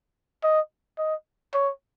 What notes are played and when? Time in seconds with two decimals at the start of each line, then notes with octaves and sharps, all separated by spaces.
0.44 D#5
0.98 D#5
1.54 C#5